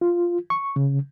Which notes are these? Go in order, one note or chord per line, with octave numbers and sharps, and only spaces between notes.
F4
C#6
C#3